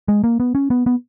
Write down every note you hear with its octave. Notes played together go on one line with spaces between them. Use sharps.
G#3
A#3
B3
C#4
B3
B3